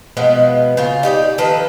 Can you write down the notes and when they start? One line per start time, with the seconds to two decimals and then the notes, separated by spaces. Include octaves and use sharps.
0.17 B2 F3 G#3 B3
0.77 C#3 F4
1.03 D#4 G4 C#5 D5
1.38 D#3 F3 A4 B4